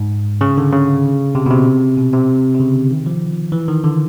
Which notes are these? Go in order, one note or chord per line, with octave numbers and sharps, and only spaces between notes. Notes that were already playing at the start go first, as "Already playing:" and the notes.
Already playing: G#2
C#3
D3
C#3
C3
B2
C3
B2
C3
C3
C#3
D3
D#3
F3
E3
D#3
D3